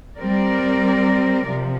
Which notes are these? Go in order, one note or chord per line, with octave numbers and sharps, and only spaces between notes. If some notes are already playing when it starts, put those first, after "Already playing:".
G3 C4 A#4 D5
C3 F3